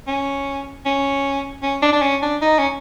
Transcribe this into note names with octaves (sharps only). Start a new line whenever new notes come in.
C#4
C#4
C#4
D4
D4
C#4
D4
D#4
C#4